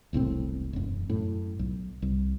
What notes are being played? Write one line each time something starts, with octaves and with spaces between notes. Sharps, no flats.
E1 C2 A2 C4
E1 F#2
F#2 A2
B1
C2